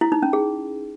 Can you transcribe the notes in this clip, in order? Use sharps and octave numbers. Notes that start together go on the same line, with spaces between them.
E4
D#4
C#4
G#4